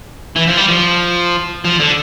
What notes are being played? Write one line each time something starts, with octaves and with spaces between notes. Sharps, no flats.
E3
F3
G3
F3
F3
D3